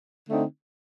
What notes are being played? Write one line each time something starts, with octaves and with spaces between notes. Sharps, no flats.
D3 A3 C4 D#4